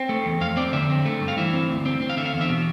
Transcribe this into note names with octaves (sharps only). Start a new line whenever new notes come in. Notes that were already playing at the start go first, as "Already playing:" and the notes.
Already playing: C4
A3
E2
F2 F5
C4 D5
D3 E5
C4
A3
G2
F5
E3 E5
C4
D2
C4
C4
F5
D3 E5
F5
E2
E5
B2